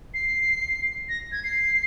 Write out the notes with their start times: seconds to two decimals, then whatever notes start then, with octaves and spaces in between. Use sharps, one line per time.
0.14 C7
1.09 A#6
1.32 G#6
1.44 C7